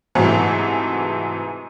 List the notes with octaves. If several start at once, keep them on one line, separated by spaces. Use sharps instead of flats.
G#2 C3 E3 F#3 A3